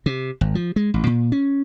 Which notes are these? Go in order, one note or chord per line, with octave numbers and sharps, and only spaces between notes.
C3
G#1
F3
G#3
A1
A#2
C#4